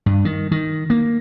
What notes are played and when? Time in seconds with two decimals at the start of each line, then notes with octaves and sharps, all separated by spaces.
0.06 G2
0.25 D#3
0.52 D#3
0.90 A#3